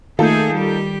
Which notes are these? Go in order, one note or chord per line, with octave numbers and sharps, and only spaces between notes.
D#3 A3 A#3 D#4 F4 G#4 A4 G6
G3 G4